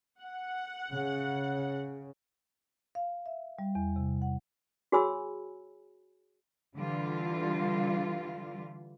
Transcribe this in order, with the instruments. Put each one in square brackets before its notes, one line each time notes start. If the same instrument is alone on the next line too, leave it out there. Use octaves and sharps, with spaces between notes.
[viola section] F#5
[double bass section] C#3
[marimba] F5
E5
G3
E2
C3
F#5
[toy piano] F#4 G#4 C#5 G#5 B5 E6
[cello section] D3 E3 G3 F4